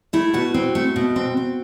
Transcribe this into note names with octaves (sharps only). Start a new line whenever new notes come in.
A3 E4
B2 F#4
C4
A3
B2
C4
C4